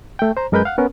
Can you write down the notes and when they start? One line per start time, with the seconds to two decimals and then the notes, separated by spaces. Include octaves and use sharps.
0.19 A3 G5
0.37 C5 A#5
0.52 F#2 G#3 A#4 B4 B5 G6
0.65 F5 F#5
0.78 B3 C#4 A#4